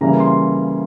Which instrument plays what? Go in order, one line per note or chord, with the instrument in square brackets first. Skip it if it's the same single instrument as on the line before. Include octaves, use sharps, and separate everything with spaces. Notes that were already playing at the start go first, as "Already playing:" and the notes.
[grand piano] C#3 E3 G3 A#3 A#5
C6